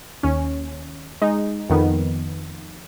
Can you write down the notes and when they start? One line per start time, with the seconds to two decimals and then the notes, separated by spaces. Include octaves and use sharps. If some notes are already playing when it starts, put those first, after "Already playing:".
0.23 D#2 C#4
1.22 G#3 D#4
1.70 F2 D#3 B3